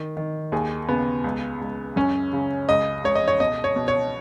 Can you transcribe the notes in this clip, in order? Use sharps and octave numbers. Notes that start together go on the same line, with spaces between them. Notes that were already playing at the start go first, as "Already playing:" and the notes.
Already playing: D#3
D#3
D#2 G#4
C#3 B3
C#2
C#2
F#2 C#4
C#3
C#2 D#5
C#2 C#5
D#5
C#5
B2 D#5
C#5
B2
C#5